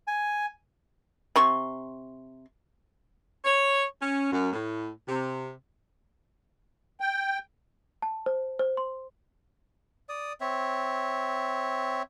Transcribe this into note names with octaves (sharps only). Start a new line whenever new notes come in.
G#5
C3 C6 C#6
C#5
C#4
F#2
A2
C3
G5
A5
C5
C5
C6
D5 D#6
C4 C#5 E5